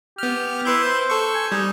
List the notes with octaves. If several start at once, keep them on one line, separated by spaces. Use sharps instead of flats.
B3 G4 F6
E4 B4 C6 G6
C5
A4 C#6
G#5
G3 D#4